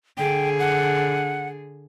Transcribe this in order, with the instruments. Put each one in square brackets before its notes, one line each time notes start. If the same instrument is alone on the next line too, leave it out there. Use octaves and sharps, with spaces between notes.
[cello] D3 G#4 [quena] G5
[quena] F#5